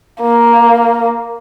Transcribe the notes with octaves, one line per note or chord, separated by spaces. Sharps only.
A#3